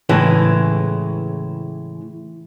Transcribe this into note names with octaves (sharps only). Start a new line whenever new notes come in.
A2 C#3 E3 G#3